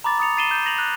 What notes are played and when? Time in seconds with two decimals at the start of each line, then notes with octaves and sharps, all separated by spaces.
0.04 A#5 B5 D6 A6
0.18 D6 D#6 A6 C#7 F7
0.37 A6 C7 D#7 E7 G7
0.51 G6 E7
0.66 A#6 F7 F#7
0.78 F#6